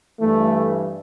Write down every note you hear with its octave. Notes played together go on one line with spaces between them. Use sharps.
G2 E3 A3